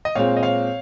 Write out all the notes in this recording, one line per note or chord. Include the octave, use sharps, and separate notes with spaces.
D#5
A#2 G#3 C4 C#5 F5
D#5
C#5 F5